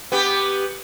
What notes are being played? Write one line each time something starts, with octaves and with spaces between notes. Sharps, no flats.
B3 G4